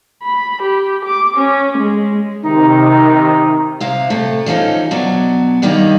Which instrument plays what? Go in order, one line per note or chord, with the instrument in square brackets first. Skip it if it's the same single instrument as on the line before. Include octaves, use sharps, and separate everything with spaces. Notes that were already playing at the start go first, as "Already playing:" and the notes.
[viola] B5
G4
D6
C#4
G#3
[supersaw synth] C3 D#3 [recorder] D#4
[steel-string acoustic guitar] C3 E4 F5
C3 A3
E3 F3 C#4 D#4 A4
B2 F#3 B3 D4
G2 D#3 G3 A#3 D#4